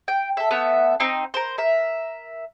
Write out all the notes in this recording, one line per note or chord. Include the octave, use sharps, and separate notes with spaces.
G5
A4 E5
A3 B3 E5 F#5
C4 D#4 C6
A#4 C5
A#4 E5